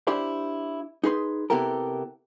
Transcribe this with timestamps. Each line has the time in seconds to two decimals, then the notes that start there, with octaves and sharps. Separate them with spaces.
0.07 D4 E4 G4 C5 D5
1.04 D#4 G#4 B4 C6
1.50 C3 B3 E4 G4 A4 A#4